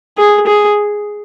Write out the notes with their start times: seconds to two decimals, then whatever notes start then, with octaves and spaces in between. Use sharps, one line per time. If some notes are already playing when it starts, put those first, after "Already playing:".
0.18 G#4
0.47 G#4